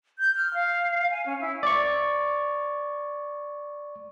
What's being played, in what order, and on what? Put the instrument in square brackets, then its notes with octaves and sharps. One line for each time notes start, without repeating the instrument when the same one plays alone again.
[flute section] G6
F6
F5
G#5
C#4
E4
[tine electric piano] D5 C#6